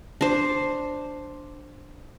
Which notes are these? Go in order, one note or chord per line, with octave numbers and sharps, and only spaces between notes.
D4 C5